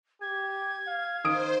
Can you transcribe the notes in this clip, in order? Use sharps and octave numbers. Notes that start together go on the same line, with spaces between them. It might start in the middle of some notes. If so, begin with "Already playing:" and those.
G4 G#6
F5
D#3 C5 D#6 D7